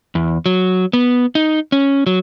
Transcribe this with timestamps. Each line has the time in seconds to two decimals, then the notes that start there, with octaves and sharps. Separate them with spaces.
0.15 E2
0.46 F#3
0.93 B3
1.35 D#4
1.72 C#4
2.07 F#3